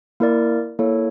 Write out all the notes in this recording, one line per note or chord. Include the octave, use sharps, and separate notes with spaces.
A#3 E4 A#4 D5
A#3 E4 A4 C#5